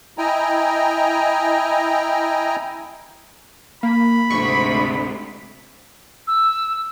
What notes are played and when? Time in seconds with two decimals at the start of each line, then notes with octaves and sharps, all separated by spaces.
0.18 E4 D#5 G5 G#5 A#5
3.83 A#3 B5
4.31 D2 G#2 C3 C#6
6.27 E6